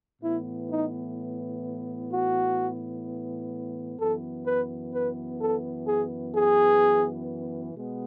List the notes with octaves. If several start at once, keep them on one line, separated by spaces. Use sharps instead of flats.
A2 E3 B3 E4
D#4
F#4
F#2 E3 B3 A4
B4
B4
A4
G#4
G#4
B2 G#3 B3